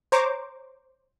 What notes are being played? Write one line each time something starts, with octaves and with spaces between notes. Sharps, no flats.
C5 C#5 A#5 C#6 D6